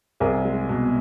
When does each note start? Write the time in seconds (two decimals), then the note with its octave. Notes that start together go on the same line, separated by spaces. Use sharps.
0.20 C2 G#4 A#4
0.45 G#3
0.69 B2